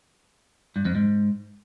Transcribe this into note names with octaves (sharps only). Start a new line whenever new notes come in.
G2
F2
G#2